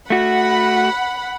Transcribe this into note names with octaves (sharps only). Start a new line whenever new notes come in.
A3 F#4 F#5 B5